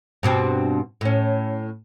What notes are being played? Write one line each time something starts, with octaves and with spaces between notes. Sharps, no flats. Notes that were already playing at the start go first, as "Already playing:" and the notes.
G2 B2 C4
A2 C#4